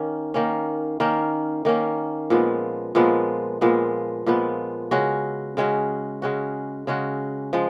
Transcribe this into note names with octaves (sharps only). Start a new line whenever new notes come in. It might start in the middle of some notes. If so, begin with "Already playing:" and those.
Already playing: D#3 A#3 C#4
D#3 A#3 C#4
D#3 A#3 C#4
D#3 A#3 C#4
A#2 F3 G#3 B3
A#2 F3 G#3 B3
A#2 F3 G#3 B3
A#2 F3 G#3 B3
C#3 G#3 C#4 F#4
C#3 G#3 C#4 F#4
C#3 G#3 C#4 F#4
C#3 G#3 C#4 F#4
F3 G#3